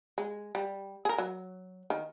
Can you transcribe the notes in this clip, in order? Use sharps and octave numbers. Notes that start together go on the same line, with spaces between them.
G#3
G3
G#4 A#4
F#3
D#3